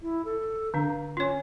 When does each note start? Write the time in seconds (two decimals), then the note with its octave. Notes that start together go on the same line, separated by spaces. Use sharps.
0.02 E4
0.25 A4
0.74 D3 D4 F5
1.17 C#4 F4 C#5